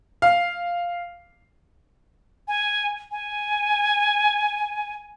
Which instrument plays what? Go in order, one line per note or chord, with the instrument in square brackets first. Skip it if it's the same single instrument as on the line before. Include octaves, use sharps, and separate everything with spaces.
[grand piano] F5
[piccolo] G#5
G#5